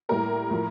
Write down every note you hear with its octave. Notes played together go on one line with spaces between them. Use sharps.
A2 G3 A#3 A#4
A2 F3